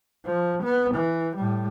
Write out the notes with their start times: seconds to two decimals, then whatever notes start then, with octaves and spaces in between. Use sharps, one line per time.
0.25 F3
0.63 B3
0.94 E3
1.36 A2 G3